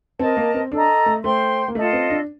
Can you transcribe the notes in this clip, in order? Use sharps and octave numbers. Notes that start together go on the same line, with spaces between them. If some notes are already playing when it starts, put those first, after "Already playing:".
C4 A#4 D#5 A5
A#3
C4
D4 A4 D#5 A#5
A3
A3 C5 G5 C6
A#3
A3 F4 A4 D#5
C4
D4